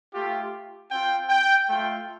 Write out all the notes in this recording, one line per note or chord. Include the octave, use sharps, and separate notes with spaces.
A3 F4 G4
C4 F4 G5
G5
A3 F4 G5